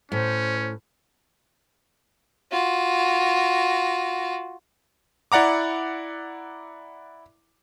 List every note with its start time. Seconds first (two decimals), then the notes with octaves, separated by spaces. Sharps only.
0.12 A2 C#4 C5
2.52 F4 F#4
5.32 E4 D5 F#5 A#5 D6